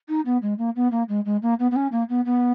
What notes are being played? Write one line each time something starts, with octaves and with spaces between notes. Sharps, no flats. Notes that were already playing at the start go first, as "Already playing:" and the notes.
D#4
B3
G#3
A#3
B3
A#3
G#3
G#3
A#3
B3
B3
C#4
A#3
B3
B3